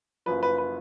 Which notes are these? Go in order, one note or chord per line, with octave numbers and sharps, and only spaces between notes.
F#1 F#2 F3 B4
B4
B4